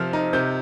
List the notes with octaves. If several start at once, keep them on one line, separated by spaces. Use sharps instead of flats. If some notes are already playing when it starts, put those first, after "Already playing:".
Already playing: C3 F3 F6
D#4
C3 G6